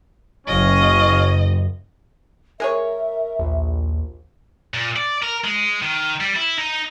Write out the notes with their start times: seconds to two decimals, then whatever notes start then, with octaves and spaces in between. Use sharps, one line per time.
0.47 F#1 C#4 C#5 D#5 F5
2.60 G#3 G#4 A#4 C#5 E5
3.39 A#1 D#2
4.74 A#2
4.96 D5
5.23 A#4
5.45 G#3
5.82 D#3
6.21 G3
6.36 E4
6.58 D#4